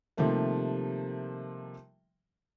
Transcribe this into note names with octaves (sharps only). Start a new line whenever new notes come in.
C3 D#3 F3 G3 A3 A#3